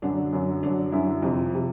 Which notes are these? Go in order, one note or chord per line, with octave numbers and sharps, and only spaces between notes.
F#2 D3 F#3 D4
F#2 D3 F#3
F#2 D3 F#3 D4
F#2 D3 F#3 E4
F2 C3 F3
C3 F3